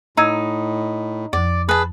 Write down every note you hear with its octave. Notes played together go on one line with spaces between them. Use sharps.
A2 D#4 A#5 E6 G#6
F2 F3 D5
G#4 B4 A5